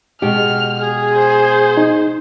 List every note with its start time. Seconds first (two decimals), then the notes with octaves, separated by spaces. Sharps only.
0.22 B2 G#3 G4 F6
0.79 G#4
1.14 C5
1.77 D#4